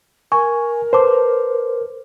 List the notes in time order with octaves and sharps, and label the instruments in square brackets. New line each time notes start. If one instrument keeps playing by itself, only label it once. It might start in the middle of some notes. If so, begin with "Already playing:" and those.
[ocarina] A#4 [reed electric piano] G#5 [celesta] C#6
[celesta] B4 A5 D6 [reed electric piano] C5